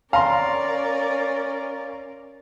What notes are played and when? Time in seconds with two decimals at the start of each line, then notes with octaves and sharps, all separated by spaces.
0.13 C#4 A#4 D5 F5 A#5 C6